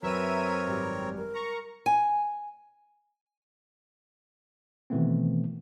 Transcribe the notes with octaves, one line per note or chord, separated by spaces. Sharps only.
F#2 C4 A#4 B4 C#5 E5 A#5 D#7
G#1 G3 A#5
A#4
A#5 C#6
G#5
B2 D#3 E3 A3 B3 C4